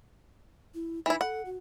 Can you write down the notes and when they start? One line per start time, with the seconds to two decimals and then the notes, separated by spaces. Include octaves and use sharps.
0.75 E4
1.06 E3 D#4 E4
1.21 A4 F#5
1.46 F#4